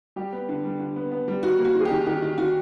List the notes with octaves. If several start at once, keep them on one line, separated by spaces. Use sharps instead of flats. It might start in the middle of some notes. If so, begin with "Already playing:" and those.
G3 G4
B3
D3
G3
D3
B3
B3
G3
D#3 F#4
A#3
F#4
D#3
G#4
G4
D#3
D#3 G4
D#3
D#3 F#4